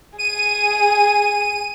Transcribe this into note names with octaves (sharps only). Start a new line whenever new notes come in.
G#4 D#7